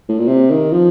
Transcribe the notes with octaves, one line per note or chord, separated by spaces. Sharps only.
A2
A#2
C3
D#3
F3